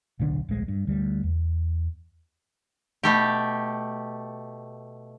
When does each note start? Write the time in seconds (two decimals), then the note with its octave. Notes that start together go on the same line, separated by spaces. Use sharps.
0.19 D1 B1 D3 D4
0.49 D1 A#1 G#3
0.68 G2
0.87 D2 G3
1.23 E2
3.03 B2 A3 G4